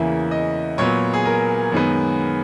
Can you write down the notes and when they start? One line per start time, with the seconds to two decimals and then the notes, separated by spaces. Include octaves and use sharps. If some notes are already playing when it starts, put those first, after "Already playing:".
Already playing: E2 C#3 E3 A#3 E5
0.31 D#5
0.78 A#2 F#3 B3 C#5
1.14 G#4
1.26 A#4
1.72 F#2 D#3 G#3 B3